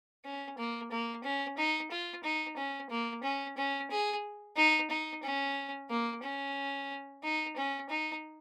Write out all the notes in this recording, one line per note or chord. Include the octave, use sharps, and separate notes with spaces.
C#4
A#3
A#3
C#4
D#4
F4
D#4
C#4
A#3
C#4
C#4
G#4
D#4
D#4
C#4
A#3
C#4
D#4
C#4
D#4